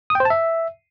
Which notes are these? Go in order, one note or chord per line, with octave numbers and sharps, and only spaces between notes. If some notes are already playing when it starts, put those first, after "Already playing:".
D#6
G5
C5
A5
E5